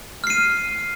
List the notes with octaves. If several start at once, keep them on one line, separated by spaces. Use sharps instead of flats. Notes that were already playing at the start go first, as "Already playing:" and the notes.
F6 C7 D#7